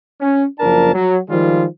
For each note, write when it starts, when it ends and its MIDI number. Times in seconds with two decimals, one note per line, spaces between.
0.21 0.44 61
0.59 0.91 30
0.59 0.91 53
0.59 0.91 62
0.59 0.91 70
0.59 0.91 81
0.94 1.18 54
1.29 1.65 51
1.29 1.65 53
1.29 1.65 55
1.29 1.65 56
1.29 1.65 65